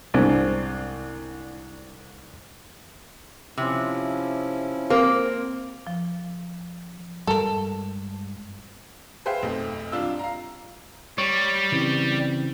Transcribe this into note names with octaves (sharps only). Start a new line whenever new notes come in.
C2 G#2 C4 D4
C3 F3 C#4 E4
A#3 C4
F3
G2 G3 G#3 A4 A#4
G#4 B4 C5 E5 F5 G5
B1 F2 A3
C2 D4 F4 E6
F5 A#5
G3 C#5
C#3 E3 C4